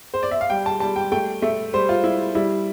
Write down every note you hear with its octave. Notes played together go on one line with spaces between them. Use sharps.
C5
D5
E5
F5
G3 G5
A5
G3 A5
G5
A3 G5
A3 E5
G3 C5
F4
G3 E4
G3 E4